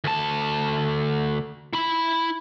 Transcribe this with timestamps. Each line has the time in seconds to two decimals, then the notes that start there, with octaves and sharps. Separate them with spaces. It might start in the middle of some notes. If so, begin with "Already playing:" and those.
0.04 D2 A5
1.73 E4 B5